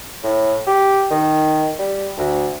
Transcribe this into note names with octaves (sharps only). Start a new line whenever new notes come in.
A2
G4
D#3
G3
D2